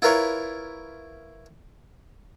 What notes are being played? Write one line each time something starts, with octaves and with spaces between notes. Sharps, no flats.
E4 F4 A#4 B4 C#5